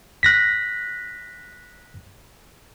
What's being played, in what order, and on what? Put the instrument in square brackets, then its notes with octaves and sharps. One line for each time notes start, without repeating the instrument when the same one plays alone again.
[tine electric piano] F#6 A#6 B6